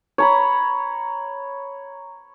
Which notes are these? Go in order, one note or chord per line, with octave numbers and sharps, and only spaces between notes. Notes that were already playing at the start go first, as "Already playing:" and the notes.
C#5 A#5 B5